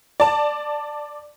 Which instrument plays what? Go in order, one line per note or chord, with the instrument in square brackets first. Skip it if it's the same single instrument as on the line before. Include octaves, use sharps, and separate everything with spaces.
[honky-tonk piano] D5 A5